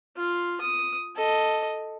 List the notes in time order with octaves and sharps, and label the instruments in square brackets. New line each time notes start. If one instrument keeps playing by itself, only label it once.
[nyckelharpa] F4
D#6
A4 D#5